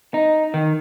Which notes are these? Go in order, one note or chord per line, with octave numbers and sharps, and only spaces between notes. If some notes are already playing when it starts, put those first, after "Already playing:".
D#4
D#3